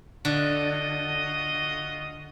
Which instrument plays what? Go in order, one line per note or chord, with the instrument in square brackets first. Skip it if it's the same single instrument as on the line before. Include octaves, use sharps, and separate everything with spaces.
[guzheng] D3 [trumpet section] F4 F#4 D#5